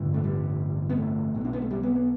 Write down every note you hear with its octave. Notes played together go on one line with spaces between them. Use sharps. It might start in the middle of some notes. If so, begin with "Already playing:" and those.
Already playing: A1 G2 D3
A3
G3
B3
A3
B1 B2
D4
B3
A3
G3
B3
B3